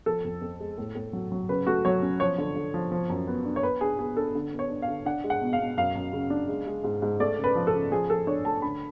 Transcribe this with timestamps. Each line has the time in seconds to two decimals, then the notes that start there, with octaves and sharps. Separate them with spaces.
0.06 F3 A4
0.25 F2
0.42 F2
0.60 G#3
0.78 A2
0.95 A2
1.13 F#3
1.32 F#3
1.49 C#3 B4
1.67 A3 F#4
1.85 F#3 C#5
2.03 C#4
2.20 F3 C#5
2.38 D3
2.56 D3
2.74 F3
2.92 F3
3.10 F#2
3.27 B3
3.45 D4
3.56 C#5
3.63 B3 B4
3.81 D4 G#4
3.99 B3 G#4
4.16 D4 A4
4.35 D3
4.53 B3
4.59 C#5
4.70 D4
4.82 F5
4.88 D3
5.06 D4 F#5
5.24 G#3
5.30 F#5
5.42 B2
5.53 F5
5.59 B2
5.77 F#2 F5
5.95 F#2
6.13 C#3
6.30 D4
6.48 G#3
6.67 G#3
6.84 G#2
7.02 G#2
7.20 A3 D5
7.38 C#3
7.44 B4
7.55 F3
7.67 A4
7.73 C#3
7.91 F3 G#4
8.09 F3 A4
8.27 D4 C#5
8.45 A3 A5
8.62 D3 B5